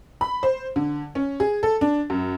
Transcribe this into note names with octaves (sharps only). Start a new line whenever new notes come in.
B5
C5
D3
C#4
G#4
A4
D4
F#2